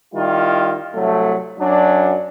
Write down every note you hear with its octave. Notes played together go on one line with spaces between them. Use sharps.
D#3 G3 E4 F4
C2 F#3 A3
F#2 F#3 D4